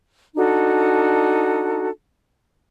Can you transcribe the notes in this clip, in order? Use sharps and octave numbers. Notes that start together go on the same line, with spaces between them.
D4 D#4 F#4 A4